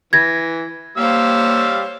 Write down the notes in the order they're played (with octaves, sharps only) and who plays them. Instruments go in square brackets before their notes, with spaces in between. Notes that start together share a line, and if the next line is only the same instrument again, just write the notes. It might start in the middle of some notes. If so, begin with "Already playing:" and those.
[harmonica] E3 [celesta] G#6 A#6
[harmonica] G3 F5 E6 [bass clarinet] A#3 [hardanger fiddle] C5 C#5